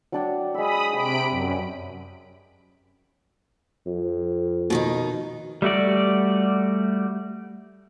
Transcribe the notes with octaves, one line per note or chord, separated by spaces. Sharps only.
F#3 D4 G5
G#3 B5 D#6 E6
C3 G5 B5 D7
F#2
F2
B2 D#3 D#4
G3 A3 F#4 D5